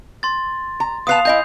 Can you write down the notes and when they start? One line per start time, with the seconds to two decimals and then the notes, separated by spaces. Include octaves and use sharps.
0.23 C6 A6
0.80 A#5
1.07 B3 B4 F5 A5 D#6 C7 F7
1.25 E4 D#5 G#5 G6